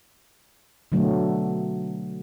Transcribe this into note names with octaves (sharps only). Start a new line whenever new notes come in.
B2 D3 F#3 A3